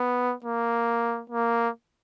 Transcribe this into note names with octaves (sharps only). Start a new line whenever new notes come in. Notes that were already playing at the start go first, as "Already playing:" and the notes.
Already playing: B3
A#3
A#3